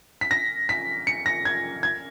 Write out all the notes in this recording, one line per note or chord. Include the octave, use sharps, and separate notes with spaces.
B6
A#6
B6
C#7
A#6
G#6
G#6